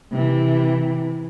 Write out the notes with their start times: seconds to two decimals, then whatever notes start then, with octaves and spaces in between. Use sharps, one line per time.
0.12 C3 E3